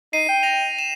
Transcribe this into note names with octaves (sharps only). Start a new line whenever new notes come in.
D#4 C7 D#7
G5
A#6 F7
E7